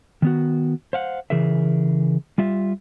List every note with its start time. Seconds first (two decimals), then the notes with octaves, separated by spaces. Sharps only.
0.22 D#3 B3 F#4
0.93 C5 F5 F#5
1.30 C#3 E3 G#4 A#4 E5
2.38 G3 F4 E5